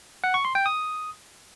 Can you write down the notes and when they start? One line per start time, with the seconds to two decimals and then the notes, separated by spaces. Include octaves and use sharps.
0.24 F#5
0.34 C#6
0.45 C6
0.55 G5
0.66 D#6